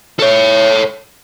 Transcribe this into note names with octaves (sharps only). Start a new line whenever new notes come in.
A4 C#5